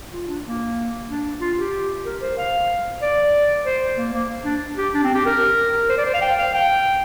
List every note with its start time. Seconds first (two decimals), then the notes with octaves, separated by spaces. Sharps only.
0.13 F4
0.28 D4
0.44 A#3
1.08 D4
1.40 F4
1.57 G4
2.05 A#4
2.21 C5
2.37 F5
3.02 D5
3.66 C5
3.97 A#3
4.13 A#3
4.45 D4
4.77 G4
4.94 D4
5.04 C4
5.14 G4
5.26 A#4
5.89 C5
5.98 D5
6.05 C5
6.14 F5
6.21 G5
6.38 F5
6.54 G5